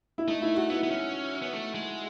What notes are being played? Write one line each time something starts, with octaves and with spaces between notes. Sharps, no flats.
E4
A3 D#4
E4
F#4
B3 E4
B3
C#4
B3
A3
G#3